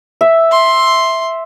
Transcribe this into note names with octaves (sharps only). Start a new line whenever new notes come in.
E5
C6